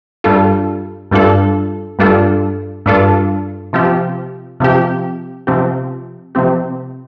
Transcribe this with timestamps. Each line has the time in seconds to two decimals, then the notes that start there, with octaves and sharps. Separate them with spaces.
0.24 G2 G3 D4 F4 A4
1.11 G2 G3 D4 F4 A4
1.99 G2 G3 D4 F4 A4
2.86 G2 G3 D4 F4 A4
3.73 C3 F3 C4 G4
4.60 C3 F3 C4 G4
5.47 C3 F3 C4 G4
6.35 C3 F3 C4 G4